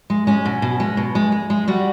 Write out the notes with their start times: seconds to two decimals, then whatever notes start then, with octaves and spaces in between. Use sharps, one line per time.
0.10 G#3
0.27 G#3 C#4
0.45 B2
0.62 B2
0.80 G#3
0.97 B2
1.15 G#3
1.32 G#3
1.50 G#3
1.68 G3 F#4